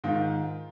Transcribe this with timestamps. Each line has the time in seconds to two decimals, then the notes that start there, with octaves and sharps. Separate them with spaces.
0.04 G#2 D#3 F4